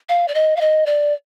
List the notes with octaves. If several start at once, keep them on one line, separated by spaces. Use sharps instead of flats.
F5
D5
D#5
F5
D#5
D5